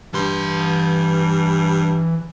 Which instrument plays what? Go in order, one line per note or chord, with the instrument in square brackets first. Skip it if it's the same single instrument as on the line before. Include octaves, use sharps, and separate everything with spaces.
[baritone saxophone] G2 [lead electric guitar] E3 C6